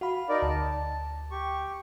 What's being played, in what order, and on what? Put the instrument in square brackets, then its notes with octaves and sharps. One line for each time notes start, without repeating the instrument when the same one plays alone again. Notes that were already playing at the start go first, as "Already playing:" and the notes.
[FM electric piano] F#4 F5 B5
[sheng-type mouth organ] D#4 A#4 D5
[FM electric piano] D2 [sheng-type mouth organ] A5
[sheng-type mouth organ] G4 C#6